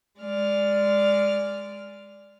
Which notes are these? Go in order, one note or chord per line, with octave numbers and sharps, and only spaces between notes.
G#3 D5 F6